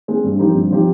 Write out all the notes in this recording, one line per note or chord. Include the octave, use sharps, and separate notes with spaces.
G#3 C4
G2
F3 C4 D#4 G4
G2
F3 C4 D#4 G4